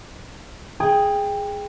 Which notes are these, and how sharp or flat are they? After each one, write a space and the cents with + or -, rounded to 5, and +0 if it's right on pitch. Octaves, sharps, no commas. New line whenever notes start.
G#4 +0 G5 +20